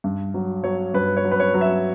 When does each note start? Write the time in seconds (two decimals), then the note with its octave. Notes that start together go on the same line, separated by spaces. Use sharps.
0.04 G2
0.34 F#3
0.64 F#3 C#5
0.94 G2 B4
1.17 C#5
1.25 F#3
1.31 B4
1.40 C#5
1.54 F#3
1.61 E5